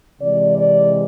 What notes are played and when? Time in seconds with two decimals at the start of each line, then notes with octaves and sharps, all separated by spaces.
0.21 C3 E3 G#3 D5
0.58 D5